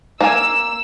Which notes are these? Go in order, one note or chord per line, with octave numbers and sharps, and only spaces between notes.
A#3 G#5 E6